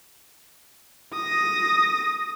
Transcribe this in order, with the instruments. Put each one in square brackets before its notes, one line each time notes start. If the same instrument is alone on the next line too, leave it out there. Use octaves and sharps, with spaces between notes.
[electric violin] D#6 A#6